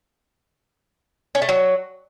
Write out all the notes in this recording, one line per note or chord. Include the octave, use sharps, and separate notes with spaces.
C#4
A3
F#3